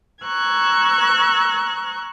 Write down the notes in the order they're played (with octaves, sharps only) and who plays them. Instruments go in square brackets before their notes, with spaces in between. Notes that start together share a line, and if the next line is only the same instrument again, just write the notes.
[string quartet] A#5 C#6 E6 F#6 G#6